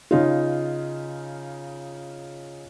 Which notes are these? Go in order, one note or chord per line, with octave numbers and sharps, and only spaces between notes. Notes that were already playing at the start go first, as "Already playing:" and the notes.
C#3 D#4 F4